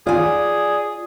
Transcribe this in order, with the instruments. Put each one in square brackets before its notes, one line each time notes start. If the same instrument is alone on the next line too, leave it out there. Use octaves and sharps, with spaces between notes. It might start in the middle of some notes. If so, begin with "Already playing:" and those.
[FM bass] F4 [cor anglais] G#4 [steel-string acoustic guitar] D5 G#5